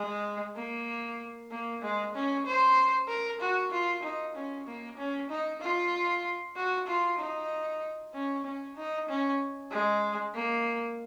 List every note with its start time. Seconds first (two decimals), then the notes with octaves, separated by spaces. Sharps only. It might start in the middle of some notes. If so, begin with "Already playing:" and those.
Already playing: G#3
0.56 A#3
1.51 A#3
1.82 G#3
2.15 C#4
2.46 C5
3.08 A#4
3.41 F#4
3.71 F4
4.03 D#4
4.36 C#4
4.67 A#3
4.98 C#4
5.30 D#4
5.61 F4
6.56 F#4
6.87 F4
7.18 D#4
8.14 C#4
8.45 C#4
8.76 D#4
9.09 C#4
9.71 G#3
10.34 A#3